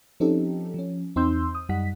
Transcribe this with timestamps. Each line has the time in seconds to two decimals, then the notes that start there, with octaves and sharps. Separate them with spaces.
0.20 F3 C4 C#4 D#4 G4 A4
0.74 F3 C#4
1.16 E2 C4 D#4 C6 E6 G6
1.55 D#6
1.69 F#2 G3 D#4 F#5 B6